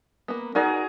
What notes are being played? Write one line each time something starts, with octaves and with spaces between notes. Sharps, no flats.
A#3 B3
D#4 F#4 G#4 A#4 D5 A#5